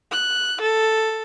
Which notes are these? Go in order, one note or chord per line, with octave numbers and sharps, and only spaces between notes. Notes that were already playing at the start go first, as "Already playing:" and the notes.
F#6
A4